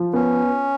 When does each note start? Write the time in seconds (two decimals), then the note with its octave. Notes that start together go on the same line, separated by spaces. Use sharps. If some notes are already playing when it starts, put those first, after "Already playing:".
Already playing: F3
0.13 B3 C#4